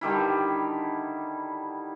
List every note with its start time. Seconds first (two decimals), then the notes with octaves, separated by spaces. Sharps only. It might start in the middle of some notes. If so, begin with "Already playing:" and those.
0.01 D3 D#3 G3 E4